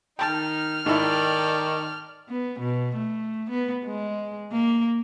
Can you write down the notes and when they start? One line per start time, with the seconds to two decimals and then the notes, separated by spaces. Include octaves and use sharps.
0.19 D#3 D#4 G5 A5 F6
0.86 G#2 D#3 D#4 E4 A4 D5 G5
2.29 B3
2.60 B2
2.96 A3
3.50 B3
3.85 G#3
4.52 A#3